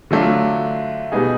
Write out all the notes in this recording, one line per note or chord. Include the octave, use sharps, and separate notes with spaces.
D3 F#3 A3 D4 F4
B2 G3 B3 D#4 G#4